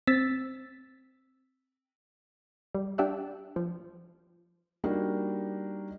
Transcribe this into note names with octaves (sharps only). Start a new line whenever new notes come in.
C4 E6 A6 B6
G3
D4 G4 E5 F#5
F3
G3 A#3 D4 D#4 F#4